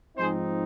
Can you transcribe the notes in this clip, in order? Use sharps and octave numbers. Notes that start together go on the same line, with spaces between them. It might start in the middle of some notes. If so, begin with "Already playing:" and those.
G#2 F3 C4 D#4 G#4 C5